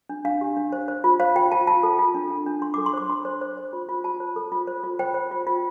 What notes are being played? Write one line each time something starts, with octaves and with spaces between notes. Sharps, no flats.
D4
D4 F5
G4
D4
C5
C5
F4
C5 F5
F4 G5
F4 A5
F4 A5
A4
F4
D4
D4
D4
D4 C6
D6
A4
C6
C5 D6
D4 C6
C5
C5
C5
F4
F4
F4 A5
C5
A4
F4
C5
F4
C5 G5
C5
F4
F4